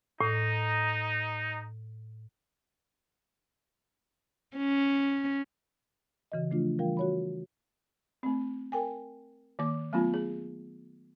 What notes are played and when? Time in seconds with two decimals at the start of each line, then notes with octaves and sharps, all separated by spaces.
0.21 A2 D#4
4.57 C#4
6.32 C#3 E3 F#4 D#5
6.51 F3 A3 D4 F4
6.79 E3 G3 F4 A#4 F5 G5
6.97 F#4 C#5 B5
8.23 A3 C4
8.72 A#4 G5 G#5
9.59 D#3 A#3 D6
9.93 F#3 A3 B3 C#4 F4
10.14 G#4